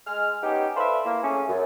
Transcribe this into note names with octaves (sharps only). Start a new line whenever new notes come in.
G#3 F6
B3 C#4 D#4 G4
A4 B4 C5 D5 E5 F5
A#3 E4
A3 C#4 G#4
F#2